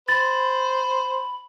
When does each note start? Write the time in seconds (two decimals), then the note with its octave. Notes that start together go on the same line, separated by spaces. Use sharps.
0.09 C5 B5 A6